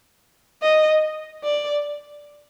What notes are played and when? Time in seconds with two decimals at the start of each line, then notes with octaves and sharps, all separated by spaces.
0.62 D#5
1.44 D5